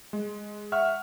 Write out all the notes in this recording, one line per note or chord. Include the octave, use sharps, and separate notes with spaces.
G#3
E5 F#5 C#6 F6